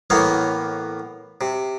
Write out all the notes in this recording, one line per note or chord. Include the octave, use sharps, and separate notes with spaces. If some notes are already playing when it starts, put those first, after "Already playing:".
A2 E3 A#3 B3 C#5 F5
C3